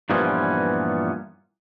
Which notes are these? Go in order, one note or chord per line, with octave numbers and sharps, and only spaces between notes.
G2 A#2 E3 F3 B3 C#4